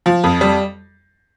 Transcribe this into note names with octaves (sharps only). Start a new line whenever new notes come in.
F3
F2
G3